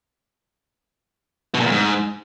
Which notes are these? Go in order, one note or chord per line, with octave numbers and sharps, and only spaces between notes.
B2
A#2
E2
G#2